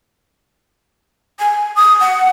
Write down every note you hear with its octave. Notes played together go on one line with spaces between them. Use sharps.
G#5
D#6
F#5